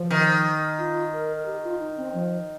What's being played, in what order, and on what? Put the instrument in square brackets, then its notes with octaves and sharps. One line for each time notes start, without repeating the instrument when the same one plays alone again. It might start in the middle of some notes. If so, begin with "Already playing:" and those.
Already playing: [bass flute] F3
[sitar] D#3
[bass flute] F4
A#4
A#4
G4
F4
D#4
C4
F3